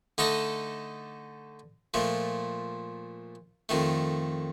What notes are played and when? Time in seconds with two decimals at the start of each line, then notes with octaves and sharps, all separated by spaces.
0.18 D3 A3 D#4 A4 D#5
1.94 A#2 F3 A3
3.69 F2 D#3 A3